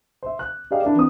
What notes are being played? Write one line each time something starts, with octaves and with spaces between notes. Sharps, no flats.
C5 E5
F#6
G4 G#4 D5 D#5 F5 G5
D4 E4 A#4 D5
E3 C4 D#6